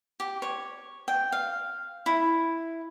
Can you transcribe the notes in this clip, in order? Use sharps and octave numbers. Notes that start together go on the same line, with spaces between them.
G4
C#5
G5
F5
E4